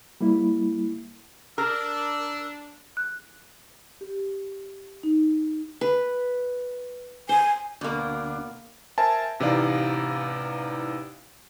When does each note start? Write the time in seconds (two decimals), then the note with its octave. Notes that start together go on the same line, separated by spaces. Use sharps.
0.21 G3 A#3 E4
1.58 D4 A#4 E6
2.97 F#6
4.01 G4
5.03 D#4
5.81 B4
7.29 C5 G#5
7.81 D2 B2 A#3 D4
8.98 A#4 C5 E5 G#5 A5
9.40 A1 C3 E3 D#4 D5 F5